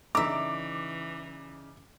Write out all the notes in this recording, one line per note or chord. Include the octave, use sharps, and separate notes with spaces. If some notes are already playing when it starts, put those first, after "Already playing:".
C#3 E3 D4 D#4 E5 A#5 D6